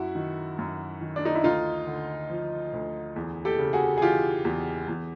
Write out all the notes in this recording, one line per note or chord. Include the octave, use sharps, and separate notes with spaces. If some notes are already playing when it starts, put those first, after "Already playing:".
Already playing: F#2 E4 F#4
D#3
F#2
D#3
D4
D#4
E4
D2 D#4 F4
D3
F3
D2
E2
G4 A4
C#3
F#4 G#4
G#4
E3 F4 G4
E2
E2